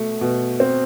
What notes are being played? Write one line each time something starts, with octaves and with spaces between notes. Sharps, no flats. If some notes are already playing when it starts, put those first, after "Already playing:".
Already playing: B2 A3
B2
C4